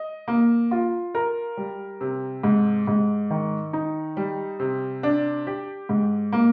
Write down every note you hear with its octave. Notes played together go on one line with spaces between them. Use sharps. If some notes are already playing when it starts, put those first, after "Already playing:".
Already playing: D#5
A#3
F4
A#4
G3
C3
G#2
G#2
D#3
D#4
G3
C3
D4
G4
G#2
A#3